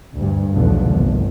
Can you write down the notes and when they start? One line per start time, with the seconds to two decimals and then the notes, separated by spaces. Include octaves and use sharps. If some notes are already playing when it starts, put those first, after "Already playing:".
0.15 D2 G2
0.53 B1 E2 A2 D3 F3 B3
0.87 G1 C2